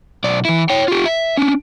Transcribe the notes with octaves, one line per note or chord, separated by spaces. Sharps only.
B1 D5
E3 E4
C#5 G5
F4 G4
E5
C#4 D4